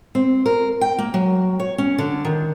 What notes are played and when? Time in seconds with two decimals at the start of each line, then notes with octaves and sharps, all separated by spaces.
0.15 C4
0.46 A#4
0.81 G5
0.99 A#3
1.14 F#3
1.59 C#5
1.78 C#4
1.98 D3
2.25 D#3